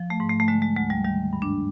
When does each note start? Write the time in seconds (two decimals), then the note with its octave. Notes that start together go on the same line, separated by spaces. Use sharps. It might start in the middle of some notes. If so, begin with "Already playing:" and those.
Already playing: F3
0.10 A3
0.20 G#2
0.30 A3
0.40 A3
0.48 D3 G#3
0.62 G#3
0.76 D2 G#3
0.90 G3
1.05 D#3 G3
1.33 G2
1.42 D4